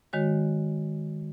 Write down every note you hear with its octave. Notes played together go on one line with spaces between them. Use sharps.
D#3 G#3 F#4 C#5